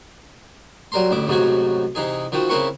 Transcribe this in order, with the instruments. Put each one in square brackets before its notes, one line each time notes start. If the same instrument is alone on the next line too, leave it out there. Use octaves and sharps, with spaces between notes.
[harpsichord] F#3 G3 A#4 A#5 C6
A1 D2 E4 D6
A1 G#2 C3 F#3 F#4 G#5
C3 E3 D#4 G#4
D#3 F3 C4 F#4
C#3 C4 E4 A#4 B4 C#6